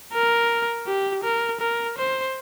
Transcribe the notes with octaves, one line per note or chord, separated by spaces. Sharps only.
A#4
G4
A#4
A#4
C5